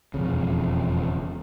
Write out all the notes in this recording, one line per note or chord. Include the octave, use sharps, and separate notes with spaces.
E1 F2 C#3